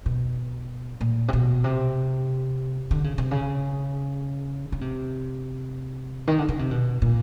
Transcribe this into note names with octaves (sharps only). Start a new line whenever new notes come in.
B2
A#2
C3
B2
C3
D3
C#3
C3
C#3
C#3
C3
D#3
D3
C#3
C3
B2
A#2